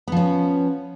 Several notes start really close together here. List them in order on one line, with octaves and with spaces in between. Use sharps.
B3 F3 C#4